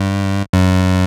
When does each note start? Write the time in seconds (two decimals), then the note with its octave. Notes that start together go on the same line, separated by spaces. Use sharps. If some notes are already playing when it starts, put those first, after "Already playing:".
Already playing: G2
0.53 F#2